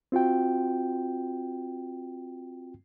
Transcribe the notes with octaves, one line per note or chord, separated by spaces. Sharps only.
C4 F4 F#4 G5